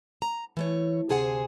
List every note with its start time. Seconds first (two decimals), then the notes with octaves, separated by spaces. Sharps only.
0.22 A#5
0.57 E3 A3 C#5
1.09 D2 C3 G#4 C5 F#5 G#5